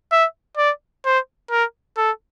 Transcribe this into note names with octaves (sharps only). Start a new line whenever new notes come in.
E5
D5
C5
A#4
A4